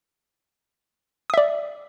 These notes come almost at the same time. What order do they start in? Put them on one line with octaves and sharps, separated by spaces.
D#6 E5 D5